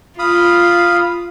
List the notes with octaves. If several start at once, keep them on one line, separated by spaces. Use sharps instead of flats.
F4 F5 B5 D#6